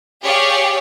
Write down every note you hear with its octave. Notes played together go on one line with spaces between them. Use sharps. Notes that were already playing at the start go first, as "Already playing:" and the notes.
G4 G#4 C#5 D5 F5